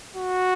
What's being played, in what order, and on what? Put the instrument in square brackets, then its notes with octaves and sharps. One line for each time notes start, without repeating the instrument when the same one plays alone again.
[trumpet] F#4